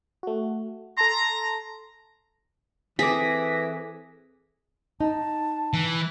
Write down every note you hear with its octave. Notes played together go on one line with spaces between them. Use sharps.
A3 F#4
A4 A5 A#5 C6
E3 C4 G#4 A4 D6 A#6 B6
D#4 A5
E3